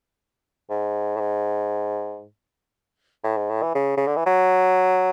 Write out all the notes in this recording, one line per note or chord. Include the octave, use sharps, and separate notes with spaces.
G#2
A2
G#2
A2
G#2
A2
E3
C#3
C#3
D3
E3
F#3